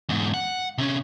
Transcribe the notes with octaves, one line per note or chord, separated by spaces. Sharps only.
E2 G#2
F#5
C3 C#4